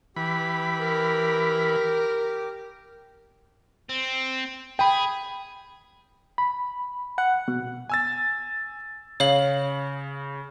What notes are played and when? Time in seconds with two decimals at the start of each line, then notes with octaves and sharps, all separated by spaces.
0.16 E3 G4 B5
0.80 A#4
3.89 C4
4.79 G#4 G5 B5
6.38 B5
7.18 F#5
7.48 B2
7.89 G#5 E6 A6
9.20 C#3 C#5 F5 F#7